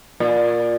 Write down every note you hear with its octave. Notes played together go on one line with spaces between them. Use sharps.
A#2